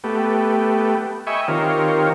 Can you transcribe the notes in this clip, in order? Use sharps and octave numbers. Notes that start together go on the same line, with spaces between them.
A3 B3 G4
D#5 E5 G5 G#5 B5 C#6
D#3 C4 F4 G4 A#4 C#5